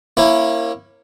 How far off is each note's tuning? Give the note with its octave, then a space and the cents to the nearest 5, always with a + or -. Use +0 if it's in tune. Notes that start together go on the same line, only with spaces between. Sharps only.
A#3 +0 C#4 -30 E4 +10